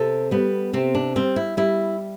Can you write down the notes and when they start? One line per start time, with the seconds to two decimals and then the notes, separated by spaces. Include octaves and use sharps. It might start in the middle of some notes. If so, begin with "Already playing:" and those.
Already playing: C3 A4
0.31 G3 B3
0.73 C3 C4
0.95 D4
1.16 G3 C4
1.36 E4
1.57 G3 E4